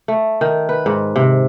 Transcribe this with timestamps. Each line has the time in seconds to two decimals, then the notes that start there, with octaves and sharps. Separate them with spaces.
0.08 A3
0.41 D#3
0.69 B4
0.86 G#2
1.16 C3